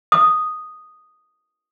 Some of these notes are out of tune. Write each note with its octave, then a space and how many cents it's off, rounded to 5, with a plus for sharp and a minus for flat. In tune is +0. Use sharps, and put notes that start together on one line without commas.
D#6 -5